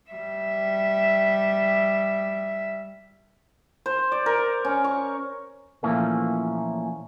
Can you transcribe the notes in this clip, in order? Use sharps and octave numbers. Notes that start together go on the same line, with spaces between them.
G3 E5
C5
D5
A#4
C#4
C#6
A#2 E3 F3 A3 A#3 C#4